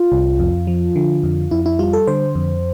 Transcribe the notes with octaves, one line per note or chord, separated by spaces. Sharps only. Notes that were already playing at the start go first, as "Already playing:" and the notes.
Already playing: F4
C2
F2
F3
D3
F2
F2 E4
E4
G3 F4
A4
D3 C5
F2